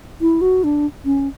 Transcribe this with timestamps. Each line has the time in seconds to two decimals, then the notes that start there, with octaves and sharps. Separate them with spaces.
0.21 E4
0.41 F#4
0.64 D4
1.05 C#4